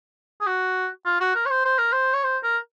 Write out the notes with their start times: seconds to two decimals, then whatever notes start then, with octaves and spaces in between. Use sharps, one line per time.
0.41 G#4
0.46 F#4
1.06 F4
1.21 F#4
1.35 A#4
1.46 C#5
1.50 C5
1.65 C5
1.78 A#4
1.92 C5
2.13 C#5
2.24 C5
2.43 A#4